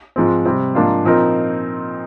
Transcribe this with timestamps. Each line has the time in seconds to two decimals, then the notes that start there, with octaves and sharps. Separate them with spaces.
0.16 G#2 F3 G#3 C4
0.45 C3 G3 C4
0.75 G#2 F3 A#3 D4 F4
1.04 A#2 F3 C4 D#4 A#4